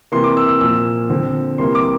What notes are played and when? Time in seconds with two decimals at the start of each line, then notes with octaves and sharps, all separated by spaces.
0.12 C3 E3 A#3 C6
0.24 D6
0.37 E6
0.49 E6
0.61 A#2 F3 A#3 E6
1.10 D3 F3 C4
1.58 C3 E3 G3 A#3 C6
1.75 D6